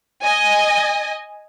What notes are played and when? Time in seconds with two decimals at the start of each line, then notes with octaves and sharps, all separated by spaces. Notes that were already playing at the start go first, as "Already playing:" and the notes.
0.24 D#5 G#5